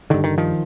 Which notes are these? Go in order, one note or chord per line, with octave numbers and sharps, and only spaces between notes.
G2 D3 D#3
D#3
D#3 F3